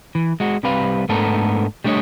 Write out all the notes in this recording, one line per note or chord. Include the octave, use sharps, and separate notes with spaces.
E3
G#3 F#4
C2 C3 G3 B4 F5
G#2 A3 B3 D4 A4 A#4
G3 A3 D4 F#4 C#5 D#5